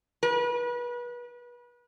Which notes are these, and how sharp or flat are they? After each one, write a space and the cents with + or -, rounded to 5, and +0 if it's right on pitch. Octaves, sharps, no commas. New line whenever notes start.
B4 -30